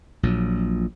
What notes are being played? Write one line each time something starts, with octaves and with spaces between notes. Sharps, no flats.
A#1 A#2 F#3